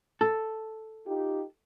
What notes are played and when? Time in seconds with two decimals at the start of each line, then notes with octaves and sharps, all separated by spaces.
0.21 A4
1.07 D#4 F4 G4